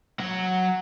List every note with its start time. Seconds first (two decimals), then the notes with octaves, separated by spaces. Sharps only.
0.20 F#3 F#5